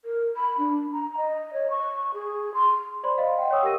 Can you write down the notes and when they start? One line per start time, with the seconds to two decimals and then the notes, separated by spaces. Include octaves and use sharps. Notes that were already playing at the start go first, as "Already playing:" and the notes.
0.05 A#4
0.37 B5
0.58 D4
0.93 A#5
1.17 D#5
1.53 C#5
1.70 C#6
2.14 G#4
2.54 C6
3.03 C5 D5 B5 C6
3.18 D#5 F5
3.38 F#5 G5
3.51 C#5 G5 C#6 D#6 E6
3.63 G4 A#4 E6 A#6 D#7